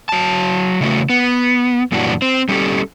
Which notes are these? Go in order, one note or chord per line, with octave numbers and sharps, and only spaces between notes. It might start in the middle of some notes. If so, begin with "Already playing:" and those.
F#3 A5
C#3 E3 A3 F#4
B3
F#2 A#2 E3 G3 D4 F#4
C4
G3 A3 C#4 F#4 G4 A4